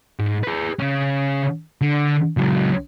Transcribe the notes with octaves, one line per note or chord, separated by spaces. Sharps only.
G#2
G#4 B4
C#3 C#4
D3
C#2 F#3